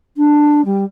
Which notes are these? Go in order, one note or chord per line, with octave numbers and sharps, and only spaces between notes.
D4
G3